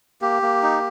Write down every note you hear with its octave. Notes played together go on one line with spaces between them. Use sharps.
A#3 G4
A#3
D#4